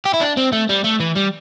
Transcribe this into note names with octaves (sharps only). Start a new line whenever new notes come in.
G4
E4
D4
C4
A3
G3
A3
E3
G3